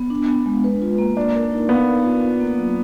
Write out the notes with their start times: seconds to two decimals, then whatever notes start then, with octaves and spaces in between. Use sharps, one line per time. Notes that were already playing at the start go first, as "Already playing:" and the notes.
Already playing: B3
0.10 D4
0.28 B3
0.46 G#3
0.64 B4
0.82 F4
0.98 A#3
1.17 D4 D5
1.35 A#4
1.52 D#4
1.69 B3 F5
1.87 A#4
2.05 F4
2.22 F4
2.40 A#3
2.57 F#3